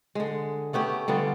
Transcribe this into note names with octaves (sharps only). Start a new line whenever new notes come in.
D3 G#3
A3 B3 C#4 G4
D3 G3 B3 F4